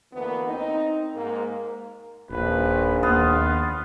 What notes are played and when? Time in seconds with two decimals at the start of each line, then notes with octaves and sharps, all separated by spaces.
0.13 D2 E3 A#3 B3
0.48 C4 D#4
1.15 G#2 A#3
2.30 D#1 A#1 B4
3.03 D#2 A#3 B3 F4